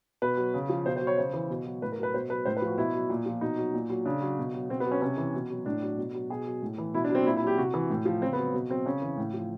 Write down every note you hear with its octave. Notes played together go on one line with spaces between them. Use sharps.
B2 B4
F#3
C#3
F3
B2 C5
C5
F#3
C#5
C#3 C5
E3
B2
F#3
A2 B4
A#4
F#3 B4
B2 C5
F#3 B4
A2 C5
B4
F3
F#4
B2 E4
F#3
A#2
F3
B2 D#4
F#3
A#2
F#3
C#3 D4
F#3
B2
F#3
B2 C4
B3
F#3
C#4
C3 C#4
E3
B2
F#3
A2 D4
F#3
B2
F#3
B2 G#4
F#3
A2
E3
B2 E4
D4
F#3
C4
A#2 E4
E4
F#3
G4
C3 F#4
E3
A2
F3
C#3 C4
B3
F#3
B2
F#3 C4
C#3 C#4
E3
A2
F3